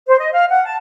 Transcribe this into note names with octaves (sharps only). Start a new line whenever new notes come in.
C5
D#5
F5
F#5
A5